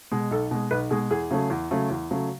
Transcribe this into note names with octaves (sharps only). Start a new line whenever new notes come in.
B2 G#3
B1 A4
B2 G#3
B1 B4
B2 G#3 G#4
E2 G#4
C#3 F#3 A3
E2
C#3 F#3 A3
E2
C#3 F#3 A3